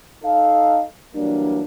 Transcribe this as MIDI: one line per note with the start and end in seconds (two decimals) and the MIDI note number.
0.24 0.83 63
0.24 0.83 69
0.24 0.83 77
1.15 1.63 52
1.15 1.63 54
1.15 1.63 55
1.15 1.63 58
1.15 1.63 62